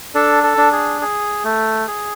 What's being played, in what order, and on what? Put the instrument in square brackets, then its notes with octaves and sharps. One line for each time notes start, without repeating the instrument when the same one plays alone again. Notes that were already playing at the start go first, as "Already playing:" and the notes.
[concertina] D4 A4
A4
D4
G#4
G#4
A3
G#4